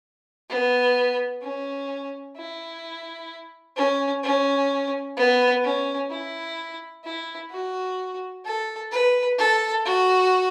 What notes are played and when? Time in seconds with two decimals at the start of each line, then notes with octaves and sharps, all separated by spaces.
0.49 B3
1.42 C#4
2.36 E4
3.76 C#4
4.23 C#4
5.17 B3
5.64 C#4
6.10 E4
7.04 E4
7.51 F#4
8.45 A4
8.91 B4
9.38 A4
9.85 F#4